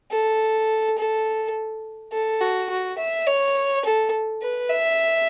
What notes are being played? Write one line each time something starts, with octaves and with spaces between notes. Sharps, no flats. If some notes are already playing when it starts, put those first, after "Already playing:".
A4
A4
A4
F#4
F#4
E5
C#5
A4
B4
E5